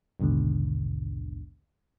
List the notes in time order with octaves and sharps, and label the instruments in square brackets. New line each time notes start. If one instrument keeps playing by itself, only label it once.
[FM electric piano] A#1 D#2 G#2 B2 D3